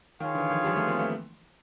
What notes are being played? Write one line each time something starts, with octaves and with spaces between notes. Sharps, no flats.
D#3 F4 G#4 C#5 F5
D3 E3
D#3 F3
F3 G3
A3 B3
A#3 C4
A3 B3